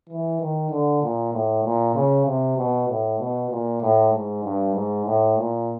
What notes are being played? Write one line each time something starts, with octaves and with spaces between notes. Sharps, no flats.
E3
D#3
D3
A#2
A2
A#2
C#3
C3
B2
A2
B2
A#2
A2
G#2
G2
G#2
A2
A#2